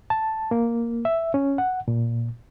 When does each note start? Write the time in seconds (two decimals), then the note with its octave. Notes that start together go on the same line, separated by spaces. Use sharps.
0.10 A5
0.51 A#3
1.05 E5
1.34 C#4
1.58 F#5
1.88 A#2